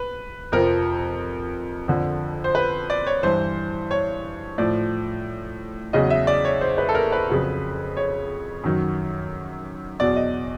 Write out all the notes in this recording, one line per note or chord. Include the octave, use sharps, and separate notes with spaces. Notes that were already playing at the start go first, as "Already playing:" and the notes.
Already playing: B4
F2 C3 F3 A#4
F2 D3 F3
C5
B4
D5
C#5
G2 E3 C5
C#5
A2 F3 D5
E2 C#3 F#3 D#5
E5
D5
C#5
C5
B4
A4
A#4
B4
F2 C#3 F#3
C#5
F#2 D#3 F#3
E2 B2 F#3 D5
D#5